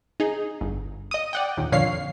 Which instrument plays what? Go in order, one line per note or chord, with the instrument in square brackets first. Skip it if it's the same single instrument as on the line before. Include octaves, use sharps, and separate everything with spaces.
[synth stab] D#4 G#4
G1
D#5 D#6
D5 F#5 G5
A#1 D#2
F2 A#2 D3 C#5 F5 C7